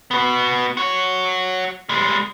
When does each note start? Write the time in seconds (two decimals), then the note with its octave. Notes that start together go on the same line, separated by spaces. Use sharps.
0.11 B3 F#4
0.77 F#4 C#5
1.89 G3 G#3